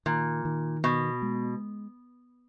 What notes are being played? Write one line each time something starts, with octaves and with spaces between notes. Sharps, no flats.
A#2 D#3
D#3
B2 B3
G#3